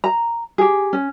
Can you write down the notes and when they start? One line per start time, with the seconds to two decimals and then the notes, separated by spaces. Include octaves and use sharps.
0.04 A#5
0.58 G4 G#4
0.93 C#4